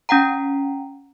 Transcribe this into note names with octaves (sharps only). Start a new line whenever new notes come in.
C#4 F#5 G5 A#5